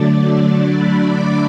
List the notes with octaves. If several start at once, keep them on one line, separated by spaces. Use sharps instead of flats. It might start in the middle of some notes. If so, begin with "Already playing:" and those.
Already playing: D3 F#3 A3 D4 D5
B5
D6